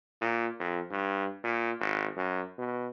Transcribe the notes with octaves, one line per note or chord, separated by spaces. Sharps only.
A#2
F2
G2
A#2
G#1
F#2
B2